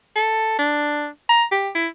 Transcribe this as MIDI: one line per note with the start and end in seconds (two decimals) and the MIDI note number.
0.16 0.59 69
0.59 1.08 62
1.29 1.45 82
1.52 1.69 67
1.75 1.88 64